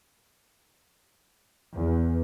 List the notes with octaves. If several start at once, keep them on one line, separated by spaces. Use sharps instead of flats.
E2